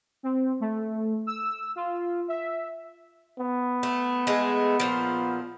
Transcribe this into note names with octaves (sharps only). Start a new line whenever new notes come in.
C4
A3
E6
F4
E5
B3
A3
G#3 A3
A#2 F3